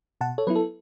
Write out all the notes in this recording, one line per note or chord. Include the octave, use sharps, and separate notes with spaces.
B2 F#5 A5
A4 C#5
F#3 B3 E4 B4
A4